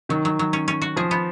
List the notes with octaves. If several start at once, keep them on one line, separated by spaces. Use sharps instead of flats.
D#3 F#3
F#3
F#3
C#4
C#4
F#4
F3 G#4
B3